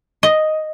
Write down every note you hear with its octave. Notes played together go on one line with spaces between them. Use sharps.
D#5